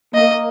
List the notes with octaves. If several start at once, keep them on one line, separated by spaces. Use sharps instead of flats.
A#3 D#5